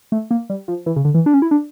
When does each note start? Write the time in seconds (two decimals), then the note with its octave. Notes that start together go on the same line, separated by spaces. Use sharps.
0.12 A3
0.31 A#3
0.50 G3
0.68 F3
0.86 E3
0.96 C#3
1.05 D3
1.14 E3
1.26 D4
1.34 C#4
1.42 E4
1.51 D4